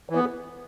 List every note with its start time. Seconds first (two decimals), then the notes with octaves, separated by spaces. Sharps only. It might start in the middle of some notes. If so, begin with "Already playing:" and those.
0.10 E3
0.15 B3